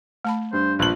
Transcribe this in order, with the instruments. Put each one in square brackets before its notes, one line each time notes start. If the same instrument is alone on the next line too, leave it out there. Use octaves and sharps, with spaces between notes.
[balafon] A3 A5 B5
[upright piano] G2 [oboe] C5
[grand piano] A#1 F#7 [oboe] B4